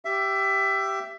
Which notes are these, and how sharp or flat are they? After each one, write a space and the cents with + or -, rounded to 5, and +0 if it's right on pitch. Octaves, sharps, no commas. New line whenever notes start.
G4 -10 E5 +20